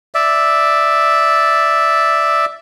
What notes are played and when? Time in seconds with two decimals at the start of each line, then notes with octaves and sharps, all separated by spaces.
0.15 D5 E5